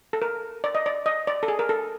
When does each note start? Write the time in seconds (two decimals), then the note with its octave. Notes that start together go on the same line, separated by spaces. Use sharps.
0.13 A4
0.22 A#4
0.64 D5
0.75 D#5
0.86 D5
1.06 D#5
1.27 D5
1.43 A4
1.48 G#4
1.59 A#4
1.69 A4